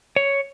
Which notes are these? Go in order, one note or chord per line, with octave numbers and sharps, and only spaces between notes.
C#5